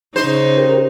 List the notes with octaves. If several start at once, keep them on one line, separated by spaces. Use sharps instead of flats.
C#3 D#4 C5
G4 A#4